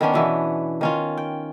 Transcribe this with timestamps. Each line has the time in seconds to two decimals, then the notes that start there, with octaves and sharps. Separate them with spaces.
0.01 D#3 B3 C#4 D4
0.14 B2 E3 B3
0.81 D#3 C#4 F4
1.17 G5